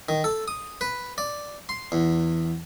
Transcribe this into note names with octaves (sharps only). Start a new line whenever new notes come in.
D#3
A4
D#6
B4
D5
C6
E2